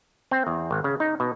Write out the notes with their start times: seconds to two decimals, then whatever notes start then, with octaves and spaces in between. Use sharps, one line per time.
0.31 C4
0.47 E2
0.71 G#1
0.84 C#3
1.00 D#4
1.20 B2